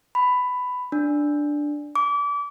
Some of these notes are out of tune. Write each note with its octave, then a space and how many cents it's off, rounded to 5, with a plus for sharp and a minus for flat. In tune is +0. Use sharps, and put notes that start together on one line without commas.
B5 +15
D4 +0
D6 -30